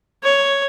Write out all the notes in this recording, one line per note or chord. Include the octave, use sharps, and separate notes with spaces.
C#5